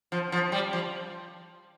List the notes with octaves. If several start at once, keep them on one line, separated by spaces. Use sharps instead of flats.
F3
F3
G3
F3